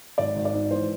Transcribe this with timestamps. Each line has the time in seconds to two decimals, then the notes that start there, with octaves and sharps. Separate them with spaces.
0.18 G#1 D5
0.36 G#1
0.45 D5
0.54 G#2
0.71 E3 C5